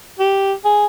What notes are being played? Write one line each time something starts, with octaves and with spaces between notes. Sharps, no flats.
G4
G#4